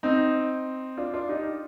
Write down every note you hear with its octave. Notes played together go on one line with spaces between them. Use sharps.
C4 D#4
D4 F4
D4 F4
D#4 G4